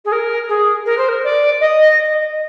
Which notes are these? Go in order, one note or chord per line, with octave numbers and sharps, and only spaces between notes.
G#4
A#4
G#4
A#4
C5
A#4
D5
D#5